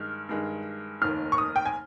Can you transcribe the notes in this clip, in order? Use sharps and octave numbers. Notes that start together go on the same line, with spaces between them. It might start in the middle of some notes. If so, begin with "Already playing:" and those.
Already playing: G2 D#3 G#3 F6
G2 D#3 G#3
F1 D#2 D#3 A#3 F6
C#6
D#6
G5
G#5